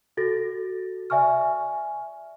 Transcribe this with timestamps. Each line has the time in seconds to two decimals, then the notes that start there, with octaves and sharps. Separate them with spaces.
0.17 F#4 A4 A6 A#6
1.10 D5 E5 G#5 C#6 F6